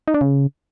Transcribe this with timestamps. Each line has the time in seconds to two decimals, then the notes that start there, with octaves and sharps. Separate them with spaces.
0.08 D#4
0.14 D4
0.21 C#3